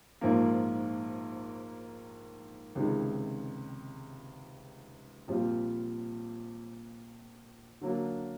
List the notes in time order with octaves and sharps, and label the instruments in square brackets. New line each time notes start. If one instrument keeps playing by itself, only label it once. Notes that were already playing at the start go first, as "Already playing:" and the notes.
[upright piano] A#1 G#2 F3 A#3
C#2 C3 D#3 G#3
A#1 A#2 G3 C4 F4
D3 F#3 A#3 D4